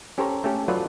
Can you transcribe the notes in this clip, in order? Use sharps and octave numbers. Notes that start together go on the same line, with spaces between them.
C#4 G4 A4 C5 C#5 A#5
A3 C#4 G4 A4
F#3 F4 A4 B4 D5 F#5